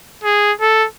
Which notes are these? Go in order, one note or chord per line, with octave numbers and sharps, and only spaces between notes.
G#4
A4